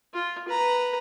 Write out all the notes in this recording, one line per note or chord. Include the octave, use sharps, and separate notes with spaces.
F4
B4 A#5